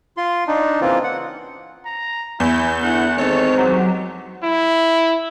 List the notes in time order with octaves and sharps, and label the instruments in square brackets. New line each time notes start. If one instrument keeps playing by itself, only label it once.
[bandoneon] F4 C6
D4 D#4
C#3 E3 A#3 C4 F4
F#5
[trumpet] A#5
[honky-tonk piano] E2 [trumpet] E4 [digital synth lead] G6
[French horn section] D3 B3 E4 [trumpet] F#5
[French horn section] D#3 G#3 C4 [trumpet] A4 [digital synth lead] C#5
[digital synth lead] F#3 [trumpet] G4
[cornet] E4